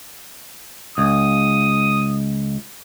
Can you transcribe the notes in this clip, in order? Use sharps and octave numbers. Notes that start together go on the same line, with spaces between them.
C#2 D#6